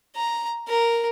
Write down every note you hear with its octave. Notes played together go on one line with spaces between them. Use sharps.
A#5
A#4